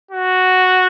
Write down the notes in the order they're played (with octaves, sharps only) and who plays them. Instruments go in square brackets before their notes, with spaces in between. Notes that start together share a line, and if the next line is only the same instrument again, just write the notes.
[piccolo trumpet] F#4